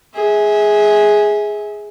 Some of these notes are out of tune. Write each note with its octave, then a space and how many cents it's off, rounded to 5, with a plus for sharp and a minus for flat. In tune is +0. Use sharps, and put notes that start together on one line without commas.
G#4 +0 E5 -30